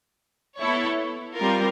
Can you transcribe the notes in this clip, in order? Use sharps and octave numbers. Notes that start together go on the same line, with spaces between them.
B3 E4 A4 C#5
G3 C4 F4 A#4